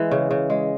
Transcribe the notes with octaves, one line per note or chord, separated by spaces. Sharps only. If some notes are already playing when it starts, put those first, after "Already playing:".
Already playing: E3 G#3
C#3
C#3
G#3